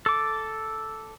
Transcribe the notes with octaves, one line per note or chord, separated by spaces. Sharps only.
A4 D6